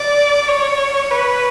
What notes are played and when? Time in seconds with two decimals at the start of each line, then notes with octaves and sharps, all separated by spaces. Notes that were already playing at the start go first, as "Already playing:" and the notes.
Already playing: D5
0.48 C#5
1.11 B4